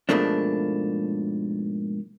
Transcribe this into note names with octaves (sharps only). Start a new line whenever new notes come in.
G#2 B2 F3 A3 A#3 D4